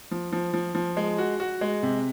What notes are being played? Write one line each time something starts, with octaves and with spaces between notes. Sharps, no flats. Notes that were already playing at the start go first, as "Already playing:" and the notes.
F3
F3
F3
F3
G#3
F#4
F#4
G#3
C3